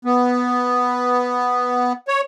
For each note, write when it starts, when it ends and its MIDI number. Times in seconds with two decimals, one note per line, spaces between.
0.05 1.93 59
2.08 2.21 73